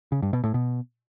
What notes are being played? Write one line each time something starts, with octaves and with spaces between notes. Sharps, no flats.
C#3
G2
B2
A2
B2